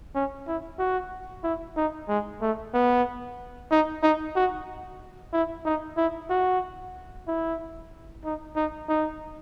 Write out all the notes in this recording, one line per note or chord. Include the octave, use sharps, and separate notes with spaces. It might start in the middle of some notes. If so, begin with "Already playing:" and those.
C#4
E4
F#4
E4
D#4
G#3
A3
B3
D#4
D#4
F#4
E4
D#4
E4
F#4
E4
D#4
D#4
D#4